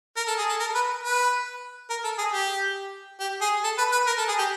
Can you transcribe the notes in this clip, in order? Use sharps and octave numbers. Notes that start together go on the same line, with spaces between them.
A#4
A4
G#4
A4
A#4
B4
B4
A#4
A4
G#4
G4
G4
G#4
A4
B4
B4
A#4
A4
G#4
G4